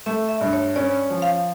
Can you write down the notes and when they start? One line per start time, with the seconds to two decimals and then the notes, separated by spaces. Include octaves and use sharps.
0.06 A3 E5
0.29 E5
0.41 G2
0.53 C#5
0.76 C#4 D5
1.10 F3
1.22 F5